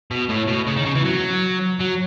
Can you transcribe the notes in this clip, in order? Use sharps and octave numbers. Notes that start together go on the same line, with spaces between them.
B2
A2
B2
C#3
D#3
C#3
E3
F#3
F#3